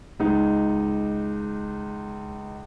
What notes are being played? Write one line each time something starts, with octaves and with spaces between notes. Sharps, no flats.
C#2 D#4